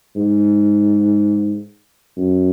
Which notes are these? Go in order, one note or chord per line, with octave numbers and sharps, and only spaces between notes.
G#2
F#2